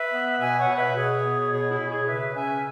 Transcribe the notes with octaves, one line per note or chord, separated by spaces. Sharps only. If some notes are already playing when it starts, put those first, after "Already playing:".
Already playing: B4 E5
B3
B2 E5 G#5
C#5 F#5
B2
B4 E5
B2 G#4 C#5
B3
B2 G#4 C#5
E4 G#4
B2
G#4 C#5
C#3 B4 E5
C#4 E5 G#5